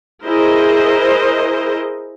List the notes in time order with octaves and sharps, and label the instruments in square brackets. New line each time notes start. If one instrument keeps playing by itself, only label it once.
[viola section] E4 G#4 A#4 C5 D#5